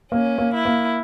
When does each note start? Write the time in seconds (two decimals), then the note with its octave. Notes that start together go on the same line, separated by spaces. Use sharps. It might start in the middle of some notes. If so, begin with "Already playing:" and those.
0.12 A#3 C#4
0.38 A#3
0.53 E4
0.65 A#3